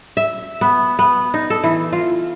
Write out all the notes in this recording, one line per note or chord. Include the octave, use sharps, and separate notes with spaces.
E5
B3
B3
D#4
A4
E3
F4